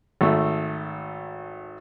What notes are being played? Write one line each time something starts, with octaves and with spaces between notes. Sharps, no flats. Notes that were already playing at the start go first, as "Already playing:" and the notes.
G#1 A3